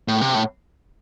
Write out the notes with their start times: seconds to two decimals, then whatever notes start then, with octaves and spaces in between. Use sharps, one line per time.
0.08 A2
0.21 C3
0.34 A2